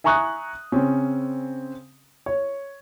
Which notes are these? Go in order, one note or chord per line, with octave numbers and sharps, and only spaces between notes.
E5 G#5 A#5 C#6 D#6 F#6
C#3 C4 C#4
C#5